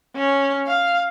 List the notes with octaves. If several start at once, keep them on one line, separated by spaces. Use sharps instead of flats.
C#4
F5